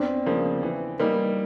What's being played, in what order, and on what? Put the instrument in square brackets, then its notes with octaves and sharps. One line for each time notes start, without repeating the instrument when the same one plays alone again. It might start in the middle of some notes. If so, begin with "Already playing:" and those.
Already playing: [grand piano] E2 [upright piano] C4 D4
[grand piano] C#3 F3 A#3
E3
G3 A#3 D#4